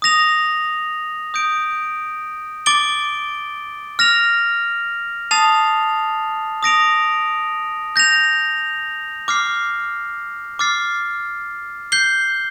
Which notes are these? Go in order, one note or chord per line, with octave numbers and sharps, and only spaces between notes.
D#6 A#6 F7
D#6 G6 D7
D6 A6 D7 G7
F6 A#6 F7
A5 D#6 A6 C7 F7
D#6 A#6 D7 F7
G6 A#6 F7
D6 F6 C7
D6 F6 A6 C7
G6 C7 G7